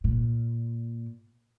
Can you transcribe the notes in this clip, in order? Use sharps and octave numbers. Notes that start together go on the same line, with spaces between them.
A#2